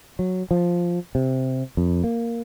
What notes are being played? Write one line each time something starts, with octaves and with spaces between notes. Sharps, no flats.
F#3
F3
C3
F2
A#3